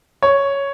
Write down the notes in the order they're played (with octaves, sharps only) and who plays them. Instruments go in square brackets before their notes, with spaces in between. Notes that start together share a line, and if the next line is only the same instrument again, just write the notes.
[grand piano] C#5